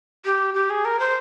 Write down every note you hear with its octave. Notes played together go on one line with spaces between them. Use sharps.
G4
G4
G#4
A#4
C5